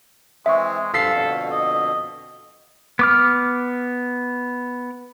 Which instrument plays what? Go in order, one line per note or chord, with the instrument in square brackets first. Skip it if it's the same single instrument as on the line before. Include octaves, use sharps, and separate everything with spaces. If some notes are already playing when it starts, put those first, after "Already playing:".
[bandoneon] E3 C4 [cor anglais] G#3 [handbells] E5 C#6
[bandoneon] G2 F3 E6 [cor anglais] A4 [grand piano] F5 B6 C7
[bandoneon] F2 B2 D3
[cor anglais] D#5
[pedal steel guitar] B3 D6 F6